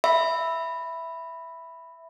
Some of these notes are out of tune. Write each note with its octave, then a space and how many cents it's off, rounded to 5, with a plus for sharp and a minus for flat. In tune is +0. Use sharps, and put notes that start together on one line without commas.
E5 +0 B5 +0